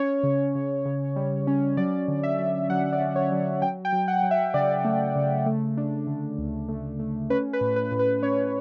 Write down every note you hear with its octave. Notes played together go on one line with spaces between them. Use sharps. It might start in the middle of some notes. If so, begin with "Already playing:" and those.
Already playing: C#4 C#5
C#3
C#3
C#3
G3
C#4
F#3 D5
D3
E5
F#3
F#3 F#5
D5
C#4
C#5
F#3
F#3 G5
G5
F#3
F#5
F#3
E5
C#3 D5
A3
C#3
A3
D4
D3
D2
A3
A3
C#4 B4
B4
A2
B4
A2
B4
C#4 C#5